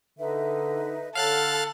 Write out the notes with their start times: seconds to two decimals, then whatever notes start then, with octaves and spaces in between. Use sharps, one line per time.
0.19 D3 D#4 B4 E5
1.15 D3 A4 C#5 F5 F#5 F6 F#6 A6